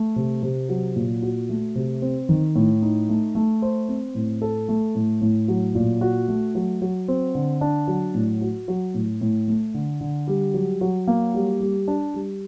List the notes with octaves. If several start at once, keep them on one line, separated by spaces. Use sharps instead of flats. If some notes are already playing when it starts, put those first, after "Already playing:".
Already playing: A3
C3
C3
F#3
A#2
F#4
A3
C3
C4
D#3
A2
D#4
A3
A3
C5
C4
A2
A4
A3
A2
A2
F#3
A#2
F#4
A3
F#3
F#3
C4
D3
D4
F#3
A2
F#4
F#3
A2
A2
A3
D3
D3
G3
F#3
F#3
A#3
G3
G3
D4
G3